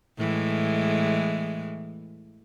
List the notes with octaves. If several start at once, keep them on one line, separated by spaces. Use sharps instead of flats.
A2 E3 G#3